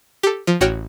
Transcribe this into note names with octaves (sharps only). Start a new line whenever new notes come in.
G4 A4
F3
A1 F#4 C#5 G5 F6